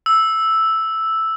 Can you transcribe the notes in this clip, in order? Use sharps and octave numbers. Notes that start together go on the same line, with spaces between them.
E6